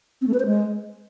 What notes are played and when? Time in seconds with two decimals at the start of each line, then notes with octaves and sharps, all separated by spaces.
0.21 C4
0.28 A3
0.34 B4
0.40 C5
0.46 G#3